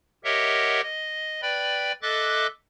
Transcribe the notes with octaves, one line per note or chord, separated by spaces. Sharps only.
G4 A#4 C#5 D#5 E5 F#5
D#5
B4 D5 G5 B5
A4 D#5 E5 D6 F#6 A6